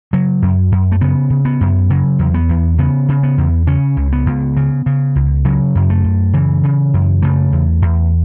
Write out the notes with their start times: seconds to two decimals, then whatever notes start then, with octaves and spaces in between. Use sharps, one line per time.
0.13 C#3 F#3
0.42 F#2
0.72 F#2
0.92 A3
1.01 C#3 B3
1.30 C#3
1.45 B3
1.61 F#2
1.90 C#3 F#3
2.19 E2
2.34 B3
2.49 E2
2.78 C#3 B3
3.09 C#3
3.23 B3
3.38 E2
3.67 C#3 C#4
3.97 C#2
4.12 B3
4.26 C#2
4.57 C#3
4.86 C#3
5.16 C#2
5.45 C#3 F#3
5.75 F#2
5.90 A3
6.04 F#2
6.33 C#3 E3
6.64 C#3
6.94 F#2
7.22 C#3 A3
7.52 E2
7.82 E2